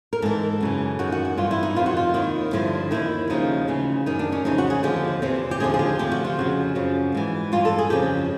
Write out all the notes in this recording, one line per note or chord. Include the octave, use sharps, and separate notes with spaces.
A#4
G#2 E3 A4
F#2 C#3 E3
F#2 D#3 F#4
F#4
F#4
G2 E3 F4
E4
D#4
F2 C3 D#3 F4
F#4
F4
D#2 D#3 E4
G2 D3 F3 E4
D#2 D#3 E4
D#2 C#3 F3 D#4
D2 C#3 E3
F#2 D#3 D#4
D4
C#4
F2 C#3 E3 D#4
F#4
G#4
D#2 D3 F3 G4
E2 C3 E3
G4
D#2 D3 F3 G#4
G#4
G4
D2 C3 F3 G4
F#4
F4
F2 C#3 F3 F#4
F#2 C#3 F3
G#2 E3
G2 E3 F4
A4
G#4
F2 C#3 F3 G4